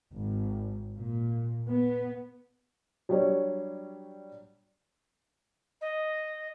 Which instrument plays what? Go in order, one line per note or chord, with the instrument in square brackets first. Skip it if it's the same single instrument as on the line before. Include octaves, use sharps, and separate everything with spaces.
[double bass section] G#1
A#2
B3
[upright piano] F#3 G3 D4 C#5 D5
[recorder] D#5